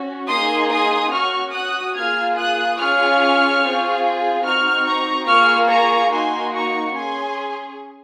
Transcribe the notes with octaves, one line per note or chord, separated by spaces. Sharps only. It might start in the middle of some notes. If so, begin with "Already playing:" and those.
Already playing: C#4 F#4
A#3 D#4 G#4 C6 D#6
C6 D#6
C#4 F#4 C#6 F6
D#6 F#6
A#3 F4 G#4 F6 G#6
D#6 F#6
C#4 F4 G#4 C#6 F6
C4 F4 G#4
C4 D#4 F#4 C#6 F6
A#5 C#6
A#3 F4 G#4 C#6 F6
A#5 C#6
A#3 D#4 F#4 G#5 C6
A#5 C#6
C#4 G#4 G#5 C6